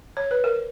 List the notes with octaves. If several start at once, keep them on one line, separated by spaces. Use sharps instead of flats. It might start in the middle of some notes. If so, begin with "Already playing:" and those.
C#5
B4
A#4